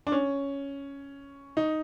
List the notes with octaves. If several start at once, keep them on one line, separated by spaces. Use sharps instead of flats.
D4
C#4
D#4